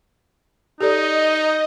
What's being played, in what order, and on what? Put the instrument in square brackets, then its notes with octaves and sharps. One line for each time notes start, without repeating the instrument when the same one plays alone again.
[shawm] D#4 [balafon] G4 A4 D5 [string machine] D#5